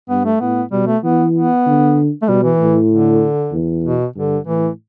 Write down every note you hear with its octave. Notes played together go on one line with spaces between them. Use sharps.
G2 B3
A3
A2 B3
B2 G3
A3
E3 B3
B3
D3
A3
B2 G3
E3
A2
D3
E2
B2
G2 D3
A2 E3